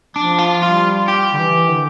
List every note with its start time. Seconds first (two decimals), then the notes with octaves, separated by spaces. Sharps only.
0.16 F3 D4
0.38 F4
0.62 G3 F4
1.08 G4
1.33 D3
1.40 E3
1.71 D3